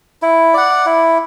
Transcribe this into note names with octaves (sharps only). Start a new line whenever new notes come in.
E4
D5 F#5
E4